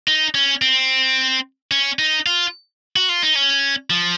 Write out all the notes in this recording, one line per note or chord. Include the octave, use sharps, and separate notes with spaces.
D#4
C#4
C4
C#4
D#4
F4
F#4
F4
D#4
C#4
F3